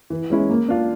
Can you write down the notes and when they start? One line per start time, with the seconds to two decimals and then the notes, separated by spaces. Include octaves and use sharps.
0.10 E3
0.30 G#3 C#4 E4
0.50 A#3
0.68 D4 F4